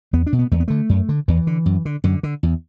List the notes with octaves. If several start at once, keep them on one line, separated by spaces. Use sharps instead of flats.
E2 B3
D4
B2
B3
E2 A3
B3
D3 A3
F#2
D3
E2 E3
D3
F#2
D3
F#2 D3
D3
E2